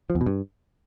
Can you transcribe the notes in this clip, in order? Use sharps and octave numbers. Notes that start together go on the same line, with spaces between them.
F3
E2
B2
G2